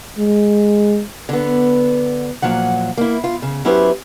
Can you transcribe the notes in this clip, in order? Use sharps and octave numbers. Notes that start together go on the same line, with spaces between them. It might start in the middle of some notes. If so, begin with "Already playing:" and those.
G#3
D3 B3
A#2 F3 F#3 F#5
A#3 E4
F4
C#3
F#3 C#4 E4 G4 B4 C5